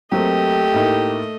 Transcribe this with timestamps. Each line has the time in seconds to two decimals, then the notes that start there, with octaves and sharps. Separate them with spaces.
0.12 F#3 A3 A#3 C4 G4 D#5
0.74 A2 A#3 D#4